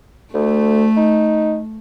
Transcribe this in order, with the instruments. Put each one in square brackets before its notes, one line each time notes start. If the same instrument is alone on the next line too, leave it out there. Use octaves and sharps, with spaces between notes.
[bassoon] D2 [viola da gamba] A3
[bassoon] D#4